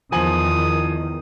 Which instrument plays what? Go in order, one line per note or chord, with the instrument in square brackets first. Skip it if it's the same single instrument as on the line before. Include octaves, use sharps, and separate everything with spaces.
[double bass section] E2 D#3 [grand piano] F3 G#5 F#7 [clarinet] D#6